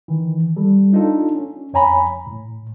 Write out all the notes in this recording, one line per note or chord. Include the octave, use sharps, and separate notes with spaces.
D#3 E3
G3 A4
D4 D#4 F4 A4
C#4
F2 C#5 G#5 A#5 B5
A2